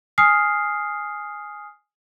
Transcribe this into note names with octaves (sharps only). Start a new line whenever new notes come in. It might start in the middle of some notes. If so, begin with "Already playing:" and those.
G#5 D#6 F6 C7